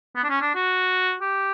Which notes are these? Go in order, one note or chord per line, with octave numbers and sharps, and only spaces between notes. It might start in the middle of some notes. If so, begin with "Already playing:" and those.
B3
D4
C#4
D4
F#4
G4